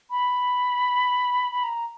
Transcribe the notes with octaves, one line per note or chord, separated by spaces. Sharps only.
B5
B5
A#5